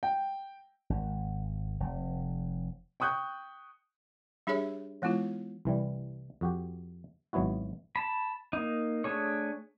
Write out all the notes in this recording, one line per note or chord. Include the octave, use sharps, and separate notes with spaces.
G5
G#1
F1
G5 C#6 D#6 F#6 G6
G3 D4 G4 G#4 C#5 E5
E3 G#3 B3 E4 F4
C2 E3 G3
F2 F#4 G4
G#1 F#3 B3 E4 F#4
A5 B5
A#3 D#4
A3 D4 G#4 C#5